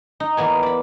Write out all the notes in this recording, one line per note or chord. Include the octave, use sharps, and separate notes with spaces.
D#4
E2 A#3 B3 G#5
D5 B5